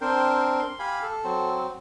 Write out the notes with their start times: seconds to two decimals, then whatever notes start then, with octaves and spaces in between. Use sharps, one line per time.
0.01 C4 D4 A#4 C5 G5
0.59 C6
0.79 G4 F5 G#5 B5
1.02 A4
1.24 F#3 C4